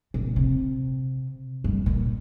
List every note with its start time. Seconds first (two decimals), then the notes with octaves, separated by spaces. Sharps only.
0.14 A#2
0.36 C3
1.64 G2
1.86 A#2